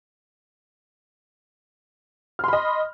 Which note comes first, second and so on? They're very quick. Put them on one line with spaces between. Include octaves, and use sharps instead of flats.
F6 C6 B5 D#5